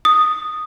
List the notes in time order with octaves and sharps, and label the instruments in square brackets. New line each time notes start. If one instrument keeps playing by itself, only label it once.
[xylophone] D#6